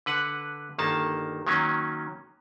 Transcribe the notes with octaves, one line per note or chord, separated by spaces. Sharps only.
D3 B4 F#5
G1 D#3 A#3 A5
D#3 F#3 A#3 C#4